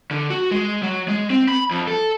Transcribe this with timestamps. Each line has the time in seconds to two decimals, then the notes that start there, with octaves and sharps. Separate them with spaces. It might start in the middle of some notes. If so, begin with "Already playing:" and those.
0.11 D3
0.30 F#4
0.51 G#3
0.83 F#3
1.08 G#3
1.30 C4
1.48 B5
1.71 F2
1.88 A4